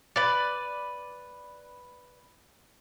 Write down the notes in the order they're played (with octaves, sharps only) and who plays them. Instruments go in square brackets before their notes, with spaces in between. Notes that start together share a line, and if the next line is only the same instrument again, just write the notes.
[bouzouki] B4 D5